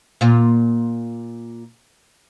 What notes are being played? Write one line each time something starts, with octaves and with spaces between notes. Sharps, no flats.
A#2 F4